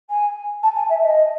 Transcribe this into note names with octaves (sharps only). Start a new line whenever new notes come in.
G#5
A5
G#5
E5
D#5